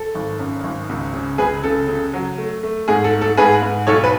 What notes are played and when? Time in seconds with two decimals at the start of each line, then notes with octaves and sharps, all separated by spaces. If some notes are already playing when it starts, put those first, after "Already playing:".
Already playing: A4
0.15 G#1
0.39 F#2
0.64 G#1
0.89 C#2
1.14 C#3
1.38 C#2 G#4 B4
1.64 C#3 A4
1.88 C#3
2.13 F#3
2.38 A3
2.63 A3
2.88 G#2 G#4
3.04 A4
3.13 A3
3.21 A4
3.37 G#2 G#4 B4
3.62 G#2
3.87 B1 A4 C#5
4.04 B4